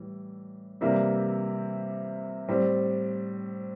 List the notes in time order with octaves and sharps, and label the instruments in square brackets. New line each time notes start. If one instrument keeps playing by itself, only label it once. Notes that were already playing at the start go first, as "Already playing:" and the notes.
Already playing: [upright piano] A2 E3 G3
C3 E3 G3 A#3 E4
A2 G3 C4